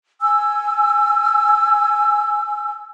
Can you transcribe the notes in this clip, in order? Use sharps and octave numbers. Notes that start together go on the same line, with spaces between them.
G#5 E6